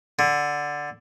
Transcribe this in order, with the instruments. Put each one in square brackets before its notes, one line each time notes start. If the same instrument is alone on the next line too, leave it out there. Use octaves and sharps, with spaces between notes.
[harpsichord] D3